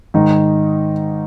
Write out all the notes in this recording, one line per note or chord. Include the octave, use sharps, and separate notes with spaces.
G#2 D#3 D#4